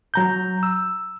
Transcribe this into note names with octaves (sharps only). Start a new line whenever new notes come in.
F#3 A#5 G6
E6